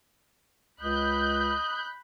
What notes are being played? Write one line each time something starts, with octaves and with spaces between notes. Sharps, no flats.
C#2 D#5 B5 F#6 G6